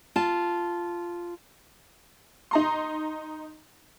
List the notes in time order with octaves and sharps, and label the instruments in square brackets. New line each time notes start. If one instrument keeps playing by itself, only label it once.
[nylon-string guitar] F4 A5
[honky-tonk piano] D#4 A#5 C6